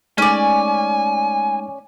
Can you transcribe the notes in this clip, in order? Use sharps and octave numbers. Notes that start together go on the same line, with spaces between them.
G#3 A3 C#4 D#4 D5 G#5